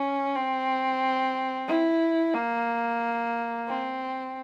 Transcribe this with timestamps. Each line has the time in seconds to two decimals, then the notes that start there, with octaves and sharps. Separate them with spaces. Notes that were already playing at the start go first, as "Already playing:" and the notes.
Already playing: C#4
0.35 C4
1.68 E4
2.34 A#3
3.68 C4